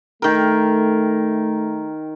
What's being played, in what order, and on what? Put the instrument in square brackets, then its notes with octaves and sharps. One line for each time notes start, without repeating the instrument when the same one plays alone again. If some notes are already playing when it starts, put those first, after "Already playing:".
[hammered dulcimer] D#3 A#4 [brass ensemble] A3